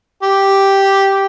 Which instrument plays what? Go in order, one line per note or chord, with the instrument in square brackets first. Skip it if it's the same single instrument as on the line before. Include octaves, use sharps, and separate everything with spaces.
[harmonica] G4